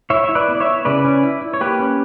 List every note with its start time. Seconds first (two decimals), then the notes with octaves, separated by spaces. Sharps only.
0.10 E4 C#5 E5
0.24 E4 E5
0.35 B4 D5
0.48 B3
0.55 D5
0.60 C#5 E5
0.66 E4
0.85 C#3 B4 D5
1.04 C#4
1.23 E4
1.41 E4
1.54 C#5
1.61 A#3 G4 B4
1.79 C#4